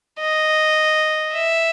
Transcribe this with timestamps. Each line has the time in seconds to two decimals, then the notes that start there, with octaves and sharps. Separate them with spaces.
0.20 D#5
1.33 E5